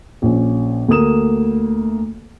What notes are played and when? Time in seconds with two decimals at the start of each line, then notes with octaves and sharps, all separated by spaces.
0.22 A#1 C#4
0.88 D2 A3 A#3 D#6 E7